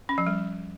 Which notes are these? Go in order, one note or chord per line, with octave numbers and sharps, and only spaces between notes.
C#4
F3
G3